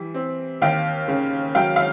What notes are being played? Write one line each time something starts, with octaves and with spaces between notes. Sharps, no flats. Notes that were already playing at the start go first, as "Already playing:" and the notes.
Already playing: E3 G3
C4
D#2 F5 G5
C#3
F#3 F5 G5
F5